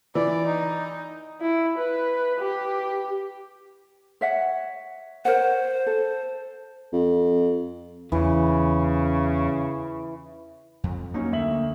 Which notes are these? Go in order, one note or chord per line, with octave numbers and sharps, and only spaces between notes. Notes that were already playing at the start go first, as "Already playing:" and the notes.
E3 D5
D#4
E4
B4
G4
C#5 E5 F#5
A#4 C5 C#5 F#5
A4
F2
E2 C#3 E3
F2
F#3 A#3 C#4 D#4
D2 E5 F#7